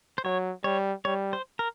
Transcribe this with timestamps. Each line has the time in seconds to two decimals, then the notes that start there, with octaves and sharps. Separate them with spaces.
0.18 C5
0.24 F#3 C#5
0.64 G3 C#5
1.05 G3 C#5
1.33 C5
1.59 A#4